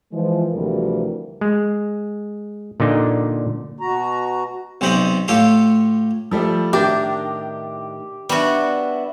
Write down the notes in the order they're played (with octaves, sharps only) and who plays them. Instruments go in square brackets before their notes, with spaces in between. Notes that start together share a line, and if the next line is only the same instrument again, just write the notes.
[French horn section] E3 F3 G#3
D2 C3 E3 F3 G3 A#4
[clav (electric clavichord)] G#3
A#2 D3 D#4
[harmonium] B2 F#4 A#5
[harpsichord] B1 C3 C5 D5 D#5 B5
A2 F4 G4 A4 C6
[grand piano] F3 G3 A3
[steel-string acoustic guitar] A2 D#3 A#4 [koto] D4 [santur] G4 [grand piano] G6
[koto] G3 F#4 [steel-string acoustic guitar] B3 D4 E4